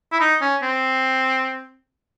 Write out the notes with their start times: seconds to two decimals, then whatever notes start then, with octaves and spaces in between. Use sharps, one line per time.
0.12 E4
0.21 D#4
0.42 C#4
0.63 C4